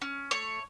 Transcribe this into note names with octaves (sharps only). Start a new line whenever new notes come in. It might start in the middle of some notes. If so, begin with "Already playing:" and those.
C#4
A3 C#5